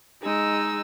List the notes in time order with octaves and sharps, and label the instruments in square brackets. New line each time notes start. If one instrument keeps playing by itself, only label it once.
[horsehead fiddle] G#3 [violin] D#4 E6